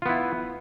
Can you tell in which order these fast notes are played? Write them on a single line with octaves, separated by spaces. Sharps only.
F4 B3 E4